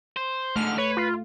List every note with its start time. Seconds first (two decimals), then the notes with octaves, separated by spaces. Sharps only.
0.16 C5
0.56 G#2 D3 A3 F6
0.78 B4 C#5
0.97 F4